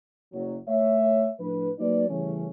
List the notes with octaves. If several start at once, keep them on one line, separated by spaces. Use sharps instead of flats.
F#1 F#3
A3 C#5 E5
A2 F3 D4 B4
F#3 A#3 D#4 B4 D5
C#3 E3 G3 A3 C#4